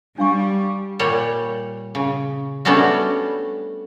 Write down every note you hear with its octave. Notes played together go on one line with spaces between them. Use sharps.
G3 D4 F5 C#6
A#2 G3 C#5
C#3
G3 A3 B3 C#4 D4 F#4